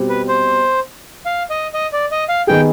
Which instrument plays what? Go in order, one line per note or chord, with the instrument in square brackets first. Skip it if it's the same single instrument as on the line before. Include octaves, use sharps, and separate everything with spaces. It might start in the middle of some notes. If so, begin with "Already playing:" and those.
Already playing: [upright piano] B2 G3 C4 G4
[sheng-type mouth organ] B4
C5
F5
D#5
D#5
D5
D#5
F5
[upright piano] D#3 B3 D#4 G#4 [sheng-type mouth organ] G5